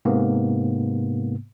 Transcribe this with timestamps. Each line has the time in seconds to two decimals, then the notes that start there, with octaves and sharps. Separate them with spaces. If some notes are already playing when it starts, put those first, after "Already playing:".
0.05 G#2 C3 A#3 B3